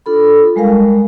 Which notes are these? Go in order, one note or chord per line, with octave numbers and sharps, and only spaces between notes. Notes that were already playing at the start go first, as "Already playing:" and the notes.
D4 F4 A4 B5
G3 G#3 A#4 F5